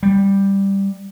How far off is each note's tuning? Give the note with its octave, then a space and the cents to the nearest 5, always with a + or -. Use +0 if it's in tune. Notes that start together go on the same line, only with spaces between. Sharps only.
G3 +5